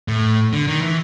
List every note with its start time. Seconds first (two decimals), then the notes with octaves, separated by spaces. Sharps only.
0.08 A2
0.53 D3
0.67 D#3
0.82 E3